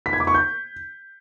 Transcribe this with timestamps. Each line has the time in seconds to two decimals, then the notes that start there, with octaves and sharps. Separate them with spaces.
0.06 B6
0.13 G#6
0.20 D6
0.27 C#6
0.34 G6